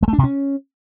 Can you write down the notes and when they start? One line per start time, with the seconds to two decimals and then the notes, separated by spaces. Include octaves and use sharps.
0.03 G#3
0.08 A3
0.13 D4
0.18 C3
0.24 C#4